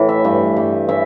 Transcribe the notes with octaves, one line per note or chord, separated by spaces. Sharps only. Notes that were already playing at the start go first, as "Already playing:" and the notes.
Already playing: A2 E3
E5
G2
G2
E3 E5